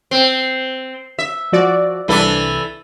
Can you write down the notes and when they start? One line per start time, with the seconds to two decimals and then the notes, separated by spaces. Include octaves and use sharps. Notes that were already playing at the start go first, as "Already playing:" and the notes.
0.11 C4
1.19 E5
1.52 F3 F#4 D5
2.08 C2 E3 D4 E4 A4